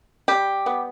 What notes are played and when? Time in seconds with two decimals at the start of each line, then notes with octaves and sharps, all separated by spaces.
0.28 G3 G4
0.66 B3